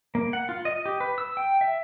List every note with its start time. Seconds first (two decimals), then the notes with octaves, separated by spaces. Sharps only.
0.15 A#3
0.33 F#5
0.49 F4
0.65 D#5
0.86 G4
1.00 B4
1.18 E6
1.37 G5
1.61 E5